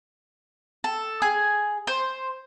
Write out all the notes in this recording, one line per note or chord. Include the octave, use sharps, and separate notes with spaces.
A4
G#4
C5